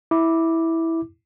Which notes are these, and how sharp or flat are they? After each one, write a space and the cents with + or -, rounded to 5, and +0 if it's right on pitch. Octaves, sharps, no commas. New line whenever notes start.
E4 -10 D6 +0